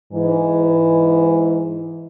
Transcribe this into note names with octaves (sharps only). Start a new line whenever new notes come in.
G#2 E3